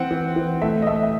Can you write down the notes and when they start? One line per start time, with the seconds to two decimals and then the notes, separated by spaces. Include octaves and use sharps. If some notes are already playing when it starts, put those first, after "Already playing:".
Already playing: E3 C4 F#5
0.11 E3
0.36 E3
0.62 A3 E5
0.82 D#5
0.87 A3 E5
1.03 E5